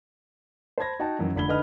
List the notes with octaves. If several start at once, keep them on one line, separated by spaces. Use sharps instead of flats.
C5 A5 B5 G#6 A#6
D#4 F#4 F#5 G5 A5
F#2 D#3 E3 D#4
F1 D3 B5 G#6 G7
D3 D#4 B4 D#5 B5 F6